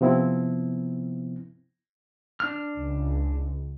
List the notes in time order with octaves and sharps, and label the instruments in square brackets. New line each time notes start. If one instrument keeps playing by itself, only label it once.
[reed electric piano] C3 F3 B3 C4 E4
[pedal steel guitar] D4 F6
[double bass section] C#2